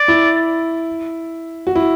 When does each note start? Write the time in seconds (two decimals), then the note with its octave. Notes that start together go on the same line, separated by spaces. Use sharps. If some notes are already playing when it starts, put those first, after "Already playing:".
Already playing: D5
0.08 E4
1.67 F#4
1.76 E4